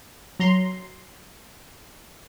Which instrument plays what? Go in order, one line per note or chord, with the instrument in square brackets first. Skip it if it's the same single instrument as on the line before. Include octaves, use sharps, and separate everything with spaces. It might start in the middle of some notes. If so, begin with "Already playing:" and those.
[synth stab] F#3 A#5 C6